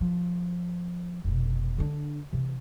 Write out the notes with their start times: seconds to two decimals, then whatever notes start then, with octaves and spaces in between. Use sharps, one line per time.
0.01 F3
1.24 F1 B2
1.78 D3 D4
2.33 C3 E3